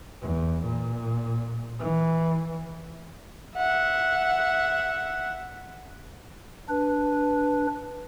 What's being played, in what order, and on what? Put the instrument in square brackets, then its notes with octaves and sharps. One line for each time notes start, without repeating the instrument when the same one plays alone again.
[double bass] E2
A#2
E3
[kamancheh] E5 F#5
[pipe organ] D4 B4